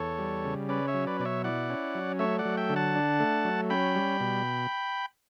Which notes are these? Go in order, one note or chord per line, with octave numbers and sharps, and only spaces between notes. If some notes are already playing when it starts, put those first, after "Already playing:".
Already playing: E2 A4 C#5
G3
C#3
C#4 B4 D5
C#5 E5
F#3
B4 D5
B2 D5
C#5 E5
E4 D5 F#5
C#4
F#3
A3 C#5 E5
D5 F#5
F#3
E5 G5
D3
F#5 A5
D4
A3
F#3
C#4 G5 B5
G3
B2